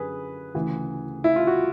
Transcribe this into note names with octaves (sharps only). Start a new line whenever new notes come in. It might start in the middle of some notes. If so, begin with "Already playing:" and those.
Already playing: F#2 D3 G#4 B4
D2 C#3 E3
E4
F4
F#4